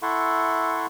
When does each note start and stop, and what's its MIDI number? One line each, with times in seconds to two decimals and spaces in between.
0.02 0.86 64
0.02 0.86 69
0.02 0.86 76
0.02 0.86 78
0.02 0.86 84
0.02 0.86 85